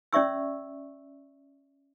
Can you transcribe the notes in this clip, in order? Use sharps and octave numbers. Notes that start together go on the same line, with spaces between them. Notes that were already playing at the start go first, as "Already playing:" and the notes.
C#4 D5 E5 C#6 E6